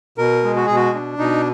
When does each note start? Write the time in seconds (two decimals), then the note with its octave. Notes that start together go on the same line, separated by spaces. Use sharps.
0.18 B2 A#4
0.44 G#3
0.56 F#4
0.66 B2 G#4
0.76 F#4
0.94 D4
1.19 B2 D#4